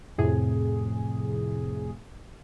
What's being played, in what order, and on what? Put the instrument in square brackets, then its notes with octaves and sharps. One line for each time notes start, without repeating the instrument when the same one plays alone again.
[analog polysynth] F2 A2 C3 G#4